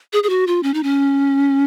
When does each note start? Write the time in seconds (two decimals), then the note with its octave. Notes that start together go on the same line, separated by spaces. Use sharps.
0.13 G#4
0.23 G#4
0.29 F#4
0.47 F4
0.63 C#4
0.74 D#4
0.83 C#4